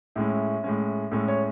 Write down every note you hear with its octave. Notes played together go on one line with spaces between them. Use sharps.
A2 G#3 C#4 E4
A2 G#3 C#4
A2 G#3 C#4 A4
C#5